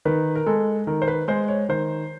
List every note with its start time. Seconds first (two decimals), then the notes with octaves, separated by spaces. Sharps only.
0.05 D#3 B4
0.35 A#4
0.46 G#3 A4
0.87 D#3 A#4
1.02 C5
1.08 B4
1.28 G#3 C5
1.48 C#5
1.69 D#3 C5